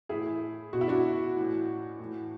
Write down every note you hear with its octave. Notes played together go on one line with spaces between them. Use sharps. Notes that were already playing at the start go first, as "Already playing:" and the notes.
A2 E3 E4 G#4
B2 F#4
E4
D4 F#4
A2 E3
A2 E3